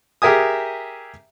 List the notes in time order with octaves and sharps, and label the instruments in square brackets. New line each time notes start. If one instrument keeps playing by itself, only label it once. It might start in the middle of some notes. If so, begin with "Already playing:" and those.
[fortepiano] G4 G#4 A#4 E5 G#5 D#6